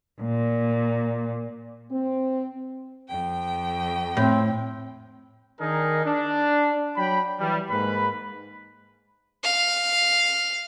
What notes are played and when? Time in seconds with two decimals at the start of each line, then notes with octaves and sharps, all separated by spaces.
0.22 A#2
1.91 C4
3.08 F2 G5
4.17 A2 C4
5.60 D#3 D4 D#4 G#4 A#4
6.05 D4
6.96 F#3 D4 G5 B5
7.39 E3 F#3 G3
7.70 G#2 A#3 B4 B5
9.44 F5